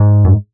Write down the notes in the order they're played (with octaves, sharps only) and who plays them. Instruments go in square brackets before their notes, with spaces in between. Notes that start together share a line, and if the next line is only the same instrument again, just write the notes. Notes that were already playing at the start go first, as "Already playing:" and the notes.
Already playing: [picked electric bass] G#2
F#2